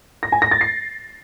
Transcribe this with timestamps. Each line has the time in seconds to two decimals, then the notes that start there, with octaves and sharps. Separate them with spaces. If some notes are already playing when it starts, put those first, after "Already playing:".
0.23 A#6
0.32 G#5
0.42 A#6
0.51 A6
0.61 C7